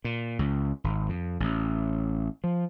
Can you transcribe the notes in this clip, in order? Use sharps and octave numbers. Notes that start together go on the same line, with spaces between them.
A#2
C#2
G#1
F2
A1
F3